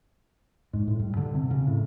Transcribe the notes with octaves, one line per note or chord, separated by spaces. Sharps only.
G#2
A2
G2
D3
C3
C#3
A2